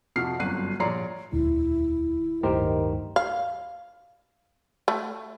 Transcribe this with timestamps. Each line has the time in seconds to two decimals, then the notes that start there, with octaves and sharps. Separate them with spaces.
0.16 F2 C3 F3 F#4 F6 C7
0.39 G1 F#2 F#6 C7 D#7
0.80 A#1 C#5 D5 A#5 C6 C7
1.32 E1 D2 A#2 E4
2.43 D1 G2 D#3 A3 G4 A#4 C5
3.16 F5
4.88 A3